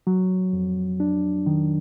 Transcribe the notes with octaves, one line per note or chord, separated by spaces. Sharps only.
F#3
F2
D4
D#3